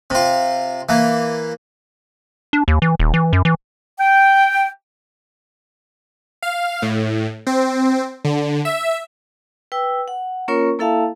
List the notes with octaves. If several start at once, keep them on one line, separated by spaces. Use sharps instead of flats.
C3 F4
E3 A#3
D4
D#2
E3
D#1
E3
F#2
E3
G5
F5
A2
C4
D3
E5
B4 G5 E6
F#5
A#3 C#4 F4 A#4 C#5 C#6
A#3 E4 A4 E5 F5 A5